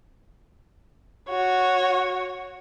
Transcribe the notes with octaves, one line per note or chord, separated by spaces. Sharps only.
F#4 C#5